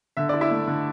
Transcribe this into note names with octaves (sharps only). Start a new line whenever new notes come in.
D3 E5
E4 D5
E4 E5
A3
D3